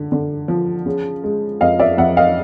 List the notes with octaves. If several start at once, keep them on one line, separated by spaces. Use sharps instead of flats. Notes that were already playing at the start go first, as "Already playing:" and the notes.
Already playing: D3
D3
F3
C#3
G#3
F2 D#5 F5
D5 E5
F2 E5 F#5
D#5 F5